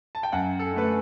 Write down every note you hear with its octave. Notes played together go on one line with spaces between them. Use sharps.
A5
G5
F#2 F#5
A4
D3 A3 B4